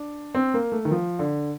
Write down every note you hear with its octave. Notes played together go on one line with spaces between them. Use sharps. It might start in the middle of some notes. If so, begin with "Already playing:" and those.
Already playing: D4
C4
A#3
A3
D#3
F3
D3